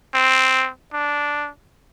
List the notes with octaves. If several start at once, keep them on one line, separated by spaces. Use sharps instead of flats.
C4
D4